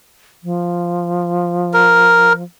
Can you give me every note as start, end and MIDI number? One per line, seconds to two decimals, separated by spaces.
0.44 2.43 53
1.74 2.33 70